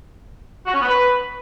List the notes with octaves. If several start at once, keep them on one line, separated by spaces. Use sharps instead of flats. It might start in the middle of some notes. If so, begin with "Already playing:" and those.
F#4
C#4
B3
B4